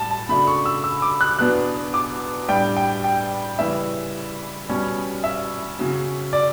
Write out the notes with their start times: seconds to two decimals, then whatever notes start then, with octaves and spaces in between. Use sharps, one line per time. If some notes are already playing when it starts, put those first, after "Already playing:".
Already playing: A2 G3 A5
0.11 A5
0.29 C#3 F#3 A3 D4 B5
0.47 C#6
0.65 E6
0.84 E6
1.02 D6
1.21 F#6
1.39 E2 B2 F#3 B3 D4 F#6
1.94 D6
2.48 A2 G3 D4 G5
2.76 G5
3.04 G5
3.58 C#3 E3 G3 C#4 E5
4.68 B2 G3 C#4
5.24 E5
5.79 C#3 F#3 C#4
6.33 D5